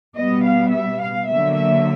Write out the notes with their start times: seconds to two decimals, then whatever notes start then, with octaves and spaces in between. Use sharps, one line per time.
0.16 B2 G3 B3 D#5
0.45 F5
0.72 E5
1.01 F5
1.29 D3 F#3 A#3 E5
1.57 E5